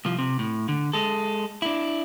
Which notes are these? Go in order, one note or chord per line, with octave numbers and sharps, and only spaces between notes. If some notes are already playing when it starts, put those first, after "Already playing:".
C2 F3
C3
A2
D3
G#3 A4
D4 E4